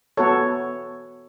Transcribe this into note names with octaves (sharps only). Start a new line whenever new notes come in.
B3 F#4 A4 C#5